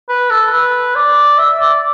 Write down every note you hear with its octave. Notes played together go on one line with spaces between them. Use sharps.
B4
A4
B4
D5
E5
D5